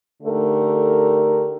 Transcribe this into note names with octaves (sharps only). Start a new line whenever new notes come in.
D3 A3 D#4 G4 A#4